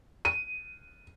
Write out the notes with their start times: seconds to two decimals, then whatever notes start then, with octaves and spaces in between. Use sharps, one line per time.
0.25 D#7